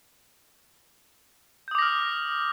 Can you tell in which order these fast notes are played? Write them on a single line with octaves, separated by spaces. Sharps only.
G6 D#6 D6 A#6 F6